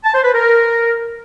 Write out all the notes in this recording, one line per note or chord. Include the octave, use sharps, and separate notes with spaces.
A5
C5
B4
A#4